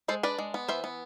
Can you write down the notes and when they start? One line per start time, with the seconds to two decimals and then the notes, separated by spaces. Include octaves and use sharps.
0.08 G#3 A4 C5
0.23 D4 B4 D5
0.38 G#3
0.54 B3
0.68 E3 C5 E5
0.84 B3